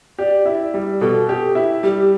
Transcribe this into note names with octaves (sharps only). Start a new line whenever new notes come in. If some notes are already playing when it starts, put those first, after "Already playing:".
G4 D5
E4
G3
B2 A4
G4
E4
G3 G4